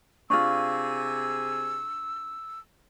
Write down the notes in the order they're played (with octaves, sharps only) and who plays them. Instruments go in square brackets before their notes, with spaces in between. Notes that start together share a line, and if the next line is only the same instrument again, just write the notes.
[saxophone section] C3 G#4 [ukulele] D4 F4 [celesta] C#6 [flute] E6